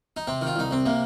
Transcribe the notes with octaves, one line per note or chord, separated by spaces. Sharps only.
D#4
C3 C4
D#3
F4
C2 D#4
C2 C4
C3 A#3